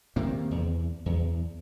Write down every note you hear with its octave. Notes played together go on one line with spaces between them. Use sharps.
C3 D#3 A#3
E2
E2